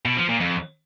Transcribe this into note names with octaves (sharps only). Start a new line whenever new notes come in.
B2
F3
A#2
F2